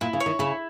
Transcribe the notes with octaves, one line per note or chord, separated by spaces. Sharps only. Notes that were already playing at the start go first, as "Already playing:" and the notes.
A#2 E4
C#3
C#5
D#3
C#3 E4